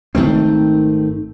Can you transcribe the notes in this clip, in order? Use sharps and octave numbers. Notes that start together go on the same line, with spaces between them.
G#1 D#3 A3 C4